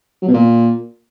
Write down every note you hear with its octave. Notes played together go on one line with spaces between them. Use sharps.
F#3
B2
A#2